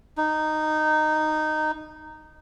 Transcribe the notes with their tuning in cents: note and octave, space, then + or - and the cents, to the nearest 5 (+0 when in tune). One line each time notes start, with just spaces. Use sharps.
D#4 -10